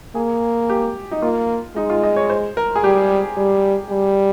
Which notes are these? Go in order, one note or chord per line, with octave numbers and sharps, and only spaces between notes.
A#3 G#4
G4
D#4
A#3 F4
G#3 D#4
F4
D#5
C#5
C5
A#4
G#4
G3 G4
G3
G3